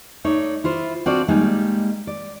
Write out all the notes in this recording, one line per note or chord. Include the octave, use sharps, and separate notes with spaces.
A3 D#4 C#5 D5
E4 F4 C5
C4 D4 F4 F#4 A4 D5
G3 G#3 A#3 D#4
D5